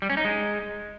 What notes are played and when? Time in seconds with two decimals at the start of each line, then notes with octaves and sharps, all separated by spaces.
0.02 G3
0.10 C#4
0.17 D#4
0.25 G#3